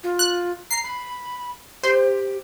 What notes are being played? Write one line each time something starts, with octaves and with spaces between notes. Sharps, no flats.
F4
F#6
A#5 C7
B5
G4 C5